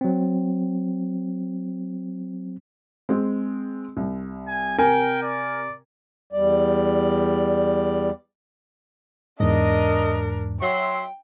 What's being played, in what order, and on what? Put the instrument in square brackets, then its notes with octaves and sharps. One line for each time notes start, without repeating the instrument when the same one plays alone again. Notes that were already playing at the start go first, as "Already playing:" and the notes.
[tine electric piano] F#3 C4
[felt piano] G#3 C4
C2
[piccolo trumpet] G#5
[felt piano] C3 A#5 [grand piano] A#4 G#5 [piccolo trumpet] G5
[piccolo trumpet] D5
[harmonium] E2 G3 D5
[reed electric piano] E2 G#2 [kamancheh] D4 A#4 [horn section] D#5
[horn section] F#3 E5 C6 [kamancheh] G5